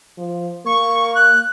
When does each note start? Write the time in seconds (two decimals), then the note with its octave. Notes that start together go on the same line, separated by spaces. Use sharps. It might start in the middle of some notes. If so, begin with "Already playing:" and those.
0.18 F3
0.66 A#3 C#6
1.15 F#6